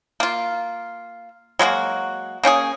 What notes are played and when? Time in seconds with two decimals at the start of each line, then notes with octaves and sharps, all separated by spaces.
0.20 A#3 F4
1.59 F#3 G#3 A#3 F#4
2.43 A#3 C#4 G4 G#4